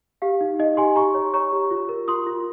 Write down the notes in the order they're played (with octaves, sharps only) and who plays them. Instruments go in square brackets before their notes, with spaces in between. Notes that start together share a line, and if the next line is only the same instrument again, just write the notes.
[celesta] G4 F5
D#4
D#4 D#5
G4 G#5 C6
G4 A#5 C#6
C#5
C#5 A#5 C#6
G4
F4
A#4
F4 C6 D#6
F4